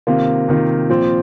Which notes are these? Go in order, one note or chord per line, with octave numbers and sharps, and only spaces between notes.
C3 D#3 A#3 F4
C3 D#3 A#3 F4
A#2 F3 C4